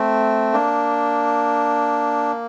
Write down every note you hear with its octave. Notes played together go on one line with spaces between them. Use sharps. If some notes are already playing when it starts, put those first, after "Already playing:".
Already playing: A3 C4
A#3 D4